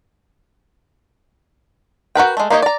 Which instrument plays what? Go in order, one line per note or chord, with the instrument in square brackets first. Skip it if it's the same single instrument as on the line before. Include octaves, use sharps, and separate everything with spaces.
[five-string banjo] F#4 A#4 B4 G5
G#3 A3
A#3 D#4 G4 C#5 D#5
D5 A#5